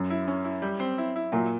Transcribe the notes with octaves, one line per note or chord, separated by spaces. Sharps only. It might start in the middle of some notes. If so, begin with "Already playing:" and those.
Already playing: F#2
E4
C#4
E4
G3
C4
E4
E4
A#2 F#3